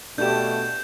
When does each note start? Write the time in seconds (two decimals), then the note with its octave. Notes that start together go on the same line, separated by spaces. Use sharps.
0.18 B2 A3 D4 G4 G6 E7